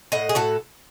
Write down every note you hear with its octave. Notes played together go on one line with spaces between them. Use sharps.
A2 D#5 F#5
G#4
A2 F#4 A4